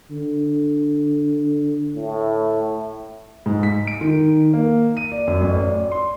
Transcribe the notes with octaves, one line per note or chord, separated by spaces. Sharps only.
D3
A2
G#2
B6
D7
D#3
A#3
D#7
D5
F#2
A1
D5
C6